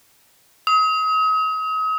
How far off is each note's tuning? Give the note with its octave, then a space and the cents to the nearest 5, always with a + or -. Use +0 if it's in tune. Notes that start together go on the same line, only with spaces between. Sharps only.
D#6 +40